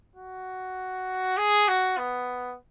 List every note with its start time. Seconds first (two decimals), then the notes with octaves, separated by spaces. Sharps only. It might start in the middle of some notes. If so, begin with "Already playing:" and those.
0.16 F#4
1.37 G#4
1.68 F#4
1.98 B3